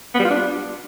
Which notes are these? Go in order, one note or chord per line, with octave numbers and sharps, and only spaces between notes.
B3
G3
F4
D4